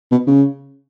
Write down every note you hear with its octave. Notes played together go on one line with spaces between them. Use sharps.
B2
C#3